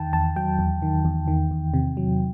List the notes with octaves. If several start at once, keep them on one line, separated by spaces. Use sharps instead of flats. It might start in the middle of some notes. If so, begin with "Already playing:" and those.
Already playing: E2 D#3 G5 A5
E2 A5
F#3 G5
E2
D#3
E2
D#3
E2
C3
F#3